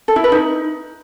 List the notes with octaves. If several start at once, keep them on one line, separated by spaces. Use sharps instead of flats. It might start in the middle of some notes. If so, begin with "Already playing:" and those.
A4
E4
B4
D#4